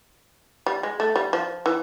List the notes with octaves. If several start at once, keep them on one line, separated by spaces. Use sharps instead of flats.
G3
G#3
A3
G3
F3
E3